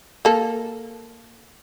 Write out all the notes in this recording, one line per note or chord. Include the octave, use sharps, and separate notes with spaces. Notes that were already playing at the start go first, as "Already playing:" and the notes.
A#3 A4